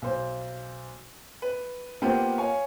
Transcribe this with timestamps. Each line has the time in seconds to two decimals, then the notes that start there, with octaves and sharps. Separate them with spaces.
0.02 B1 C5
1.42 B4
2.02 A#3 B3 F4 G4 C5
2.38 C#5 F5 G#5